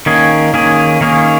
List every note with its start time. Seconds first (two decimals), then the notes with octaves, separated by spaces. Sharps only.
0.06 D#3 A#3 C#4 G#4
0.54 D#3 A#3 C#4 G#4
1.01 D#3 A#3 C#4 G#4